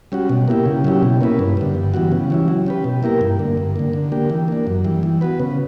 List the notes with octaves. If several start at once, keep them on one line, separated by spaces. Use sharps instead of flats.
G3 C#4 F#4
B2
A#3 E4 G4
C#3
F#3 C#4 E4 G4
B2
A#3 C#4 E4 B4
G2
D3 G3
G2
E3 G3 B3 F#4
C#3
E3 G3 C#4 E4
F#3
C#4 G4 B4
B2
A#3 E4 G4 A#4
G2
D3 A#3
G2
D3 A#3
D3
A#3 D4 G4
E3
A#3 D4
F#2
E3 G3
E3
B3 F#4 B4
C#3